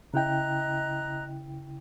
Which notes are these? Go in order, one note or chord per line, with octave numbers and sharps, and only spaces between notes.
C#3 E4 D#5 G5 A#5 F#6